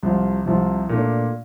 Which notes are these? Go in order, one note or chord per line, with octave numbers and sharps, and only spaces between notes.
C2 C3 F3
C2 C3 F3
A#2 A3 D4